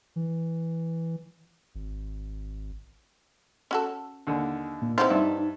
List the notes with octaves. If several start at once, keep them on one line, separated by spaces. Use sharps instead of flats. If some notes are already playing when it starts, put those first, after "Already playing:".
E3
G#1
C#4 F#4 A4
D#2 D3
A#2
E3 F3 C4 D#4 F4 C5 F#5
G2 D5 E5